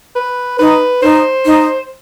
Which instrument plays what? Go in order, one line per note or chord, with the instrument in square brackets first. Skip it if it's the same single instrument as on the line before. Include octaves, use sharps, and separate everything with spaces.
[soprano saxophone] B4
[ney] D#4 [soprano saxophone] B4
[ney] D#4 [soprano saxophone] C5
[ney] D#4